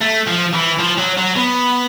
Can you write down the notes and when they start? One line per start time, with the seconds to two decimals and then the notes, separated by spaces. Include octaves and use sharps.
0.01 A3
0.27 F3
0.53 E3
0.79 F3
0.98 F#3
1.18 F#3
1.36 B3